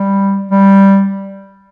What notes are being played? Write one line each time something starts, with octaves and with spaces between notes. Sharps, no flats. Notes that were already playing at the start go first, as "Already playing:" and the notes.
Already playing: G3
G3